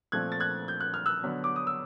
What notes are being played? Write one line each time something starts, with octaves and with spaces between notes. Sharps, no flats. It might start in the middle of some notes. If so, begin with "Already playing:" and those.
A#2 F3 A3 C4 F#6 G#6
A6
F#6 G#6
G6
F#6
F6
E6 F#6
D3 F#3 B3
D6
D#6
E6